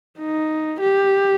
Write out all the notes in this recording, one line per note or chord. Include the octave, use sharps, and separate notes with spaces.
D#4
G4